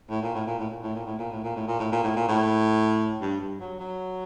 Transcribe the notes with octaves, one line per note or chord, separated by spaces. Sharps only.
A2
A#2
A2
A#2
A2
A#2
A2
A#2
A2
A#2
A2
A#2
A2
A#2
A2
A#2
A2
A#2
A2
G2
G2
F#3
F#3